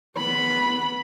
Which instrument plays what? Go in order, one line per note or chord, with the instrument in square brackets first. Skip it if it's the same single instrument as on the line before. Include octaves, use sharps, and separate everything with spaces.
[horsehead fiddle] B3 B5